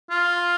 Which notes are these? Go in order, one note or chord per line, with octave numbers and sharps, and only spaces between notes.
F4